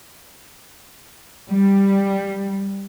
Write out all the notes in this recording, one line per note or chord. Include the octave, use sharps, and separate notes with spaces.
G3